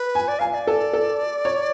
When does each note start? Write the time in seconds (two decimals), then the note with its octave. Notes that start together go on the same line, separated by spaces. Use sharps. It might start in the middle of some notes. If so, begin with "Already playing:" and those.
Already playing: B4
0.15 G#5
0.28 D5
0.39 F5 G#5
0.51 F5
0.54 D5
0.67 A4
0.93 A4
1.45 C#5